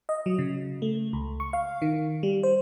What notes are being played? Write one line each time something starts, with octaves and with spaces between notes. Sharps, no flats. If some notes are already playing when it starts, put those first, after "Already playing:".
D#5
F#3
C#3
A3
C#2
C#6
F5
D#3
G3
C5